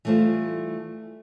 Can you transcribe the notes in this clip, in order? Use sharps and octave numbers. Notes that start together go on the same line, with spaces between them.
E3 G3 A3 F4 C5